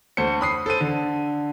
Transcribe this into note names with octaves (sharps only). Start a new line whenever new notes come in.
D2 C5 C#7
B5 D#6 C7
A4 C5 D#7
D3